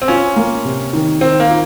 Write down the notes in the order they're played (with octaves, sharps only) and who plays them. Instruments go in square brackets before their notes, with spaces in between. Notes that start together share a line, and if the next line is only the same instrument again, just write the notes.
[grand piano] C4
[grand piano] C#4 [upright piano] F4
[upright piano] A#3
C3
D#3
[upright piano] D#3 [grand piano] C4
[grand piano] A#3
[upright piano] F4